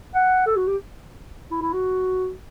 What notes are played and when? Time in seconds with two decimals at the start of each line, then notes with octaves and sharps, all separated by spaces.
0.14 F#5
0.46 A4
0.56 F#4
0.67 G4
1.51 E4
1.61 E4
1.73 F#4